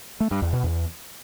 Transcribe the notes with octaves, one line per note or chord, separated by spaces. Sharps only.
A3
G2
E2
B2
E2